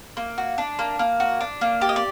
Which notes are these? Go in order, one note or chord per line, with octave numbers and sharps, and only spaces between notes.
A#3
F#4
D4
A#3
A#3
F#4
D4
A#3
G4 D5
D#5
D5